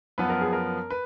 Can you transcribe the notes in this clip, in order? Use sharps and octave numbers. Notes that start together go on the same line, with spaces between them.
F#2 F3 B3 B4
A#4
G#4
A#4
B4